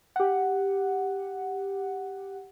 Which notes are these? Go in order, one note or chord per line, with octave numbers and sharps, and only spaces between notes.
G4 F#5